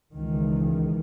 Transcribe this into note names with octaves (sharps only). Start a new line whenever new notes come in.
C#2 D#3 E3